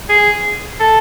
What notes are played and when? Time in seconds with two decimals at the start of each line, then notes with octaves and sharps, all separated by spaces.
0.09 G#4
0.80 A4